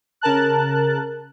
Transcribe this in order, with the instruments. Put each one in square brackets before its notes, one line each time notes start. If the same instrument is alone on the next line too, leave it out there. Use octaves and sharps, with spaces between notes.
[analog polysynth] C#3 A#4 A5 F#6